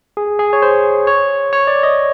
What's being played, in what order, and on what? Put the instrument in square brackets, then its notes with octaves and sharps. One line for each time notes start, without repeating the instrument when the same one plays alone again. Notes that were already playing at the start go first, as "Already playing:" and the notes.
[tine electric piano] G#4
G#4
C#5
C5
C#5
C#5
D5
D#5